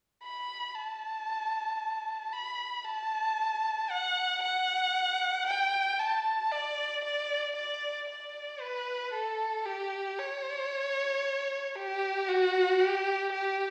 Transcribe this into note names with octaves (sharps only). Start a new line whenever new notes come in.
B5
A5
B5
A5
F#5
F#5
G5
A5
D5
D5
D5
D5
B4
A4
G4
C#5
G4
F#4
G4
G4